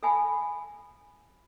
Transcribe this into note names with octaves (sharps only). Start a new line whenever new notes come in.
A4 E5 F#5 G#5 B5